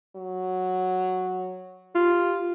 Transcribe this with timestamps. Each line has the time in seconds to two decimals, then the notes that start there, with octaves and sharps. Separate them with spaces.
0.16 F#3
1.95 F4 G4